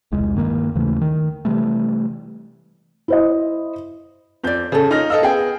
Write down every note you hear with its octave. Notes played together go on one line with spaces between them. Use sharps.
E1 C2 G#3
G2 D#3 A#3
D#2 C#3 E3 A3
D#3
C3 E3 G3 A3
E4 C5 D#5
F2 B4 D5 G6
C#3 G#4 A4
D#4 F4 A#4 C#5 F6 A#6
A4 D#5 F5 E6
B3 G#4 G5